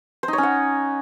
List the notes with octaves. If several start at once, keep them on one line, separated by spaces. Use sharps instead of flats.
C5
D#4
C#5
C#4
F#5